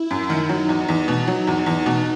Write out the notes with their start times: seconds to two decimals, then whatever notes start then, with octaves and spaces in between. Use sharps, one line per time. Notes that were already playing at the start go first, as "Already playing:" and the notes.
Already playing: E4
0.11 F#2
0.30 D#3
0.49 F#3 D#4
0.69 E2
0.89 E2
1.08 B2
1.27 F#3
1.47 E2
1.66 E2
1.86 B2